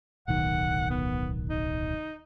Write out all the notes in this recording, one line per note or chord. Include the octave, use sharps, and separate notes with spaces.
D1 B1 D#3 F#5
B3
D#4